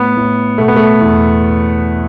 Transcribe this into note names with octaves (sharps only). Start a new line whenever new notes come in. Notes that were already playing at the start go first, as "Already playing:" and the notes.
Already playing: A2 B3
A2
B2 A3
B3
A3
E2